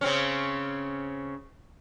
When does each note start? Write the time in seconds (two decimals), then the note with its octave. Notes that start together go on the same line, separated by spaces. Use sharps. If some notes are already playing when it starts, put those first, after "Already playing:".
0.01 C#3 C4 C#4